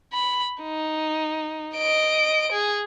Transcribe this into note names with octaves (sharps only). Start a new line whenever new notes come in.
B5
D#4
D#5 D7
G#4